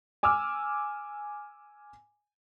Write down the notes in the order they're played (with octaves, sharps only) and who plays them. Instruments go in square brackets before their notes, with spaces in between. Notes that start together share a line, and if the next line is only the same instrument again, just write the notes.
[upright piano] G#5 D6 E6 F6